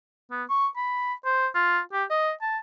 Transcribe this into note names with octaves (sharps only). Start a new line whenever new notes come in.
B3
C#6
B5
C5
F4
G4
D#5
A5